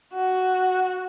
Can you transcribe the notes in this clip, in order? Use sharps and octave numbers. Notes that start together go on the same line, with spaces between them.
F#4